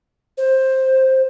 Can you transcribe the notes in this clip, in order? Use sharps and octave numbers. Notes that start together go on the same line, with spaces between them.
C5